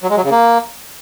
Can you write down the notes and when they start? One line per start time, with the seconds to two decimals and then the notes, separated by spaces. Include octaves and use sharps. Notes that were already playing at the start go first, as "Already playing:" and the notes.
0.03 F#3
0.10 G#3
0.17 F#3
0.24 C#3
0.31 A#3